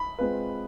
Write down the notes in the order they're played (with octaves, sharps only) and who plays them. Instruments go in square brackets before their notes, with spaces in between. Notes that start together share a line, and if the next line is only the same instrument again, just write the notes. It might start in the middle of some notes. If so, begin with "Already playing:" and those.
Already playing: [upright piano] B5
[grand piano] G#3 C4 F4 B4